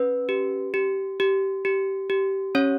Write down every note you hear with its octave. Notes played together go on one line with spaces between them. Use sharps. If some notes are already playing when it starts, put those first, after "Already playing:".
Already playing: C#4 B4
G4
G4
G4
G4
G4
C#4 C#5